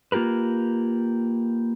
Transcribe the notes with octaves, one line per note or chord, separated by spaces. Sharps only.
A#3 F4 G4 A#4 B4